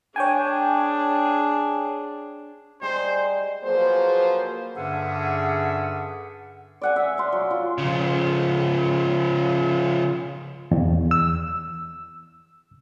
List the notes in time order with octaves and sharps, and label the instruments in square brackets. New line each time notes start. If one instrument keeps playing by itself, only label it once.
[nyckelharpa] D4 G#4 [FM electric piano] C#5 G5 G#5
[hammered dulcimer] G3 D#4 G#4 [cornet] C5
[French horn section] F3 F#3 A#3 G#4 B4 C5
[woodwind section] G2 D3 C#4 G#4 E5 F#5
[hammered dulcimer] D5 F#5 G#5
E5
F5 C6
F#3
F4
[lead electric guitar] C#3 F3
[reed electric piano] E2
E6